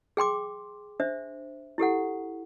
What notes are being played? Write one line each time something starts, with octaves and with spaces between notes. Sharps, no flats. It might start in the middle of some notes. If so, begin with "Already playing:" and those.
G#4 G5 C6 D6
D4 C5 E5
E4 G4 A4 F#5